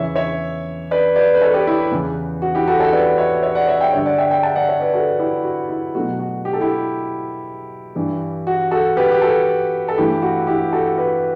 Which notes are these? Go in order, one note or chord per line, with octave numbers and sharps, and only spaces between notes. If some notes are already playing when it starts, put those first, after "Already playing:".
Already playing: E2 C#3 E3 C#5 E5
C#5 E5
B4 D5
B4 D5
B4
A4 C#5
G4 B4
E4 G4
E2 C#3 E3
F#4
E4 G4
F#4 A4
A4 C#5
B4 D5
C#5 E5
C#5 E5
D5 F#5
C#5 E5
E5 G5
G2 D3 G3 C#5 E5
D5 F#5
E5 G5
E5 G5
F#5 A5
D5 F#5
C#5 E5
B4 D5
F#4 A4
E4 G4
F#4
E4
B2 F#3 A3 F#4
F#4
G4
A4
E4 G4
G2 E3 G3
F#4
F#4 A4
G4 B4
G4
F#4 A4
A4
G2 E3 A3 E4 G4
F#4
E4 G4
F#4 A4
G4 B4